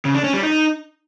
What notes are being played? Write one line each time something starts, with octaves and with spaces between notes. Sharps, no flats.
C#3
D4
C#4
G3
D#4